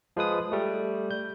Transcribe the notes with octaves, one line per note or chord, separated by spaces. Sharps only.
F3 G#3 B4 D#6
G3 A3
G6